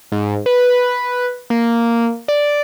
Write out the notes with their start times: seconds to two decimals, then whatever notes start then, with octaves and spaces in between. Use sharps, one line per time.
0.12 G#2
0.46 B4
1.50 A#3
2.28 D5